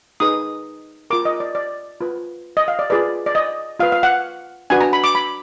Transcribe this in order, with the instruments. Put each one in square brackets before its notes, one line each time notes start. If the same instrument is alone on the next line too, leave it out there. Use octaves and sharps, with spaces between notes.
[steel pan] D#4 G#4 B4 D#6
F4 A#4 D6
D#5
D5
D5
F4 B4
D#5
F5
D5
F4 G#4 B4 D5
D5
D#5
F4 B4 F5
F5
F#5
D4 F#4 B4 G#5
A#5
B5
D6
B5